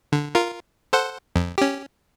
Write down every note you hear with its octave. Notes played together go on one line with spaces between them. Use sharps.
D3
F4 A#4
A4 C5 F#5
F2
C#4 G4